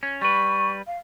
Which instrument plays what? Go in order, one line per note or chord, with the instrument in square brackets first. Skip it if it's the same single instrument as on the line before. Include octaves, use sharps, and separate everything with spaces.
[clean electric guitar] C#4
[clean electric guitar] G3 B4 [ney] C#6
[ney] F5